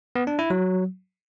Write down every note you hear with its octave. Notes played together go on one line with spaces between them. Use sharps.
B3
D4
E4
F#3